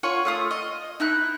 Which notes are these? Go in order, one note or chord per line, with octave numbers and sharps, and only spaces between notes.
F4 C#5 F#5 C#6
A3 F4 D#6
D#5
D#4 E4 F#6